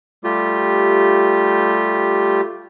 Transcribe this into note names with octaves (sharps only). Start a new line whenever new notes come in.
G3 A3 F4 G4